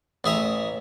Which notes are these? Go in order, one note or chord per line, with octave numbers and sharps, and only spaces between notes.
A1 G#4 E5 A#5